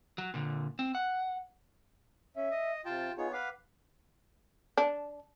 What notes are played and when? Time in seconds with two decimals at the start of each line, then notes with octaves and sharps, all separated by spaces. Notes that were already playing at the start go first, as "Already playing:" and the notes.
0.18 F#3
0.34 A#2 D3
0.79 C4
0.95 F#5
2.36 C#4 E5
2.51 D#5
2.85 C3 F4 G5 A5
3.18 B3 D#4 F4 G#4 C#5
3.33 B4 F5 F#5 D6
4.77 D4